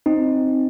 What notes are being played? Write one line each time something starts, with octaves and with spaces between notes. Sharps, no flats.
C4 D#4